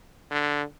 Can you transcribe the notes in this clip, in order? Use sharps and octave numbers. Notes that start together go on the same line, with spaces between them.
D3